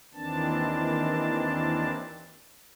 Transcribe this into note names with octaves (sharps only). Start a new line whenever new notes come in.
D#2 D#3 E3 C4 D4 A5